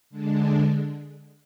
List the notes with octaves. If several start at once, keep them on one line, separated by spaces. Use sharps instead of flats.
D3 G#3 D4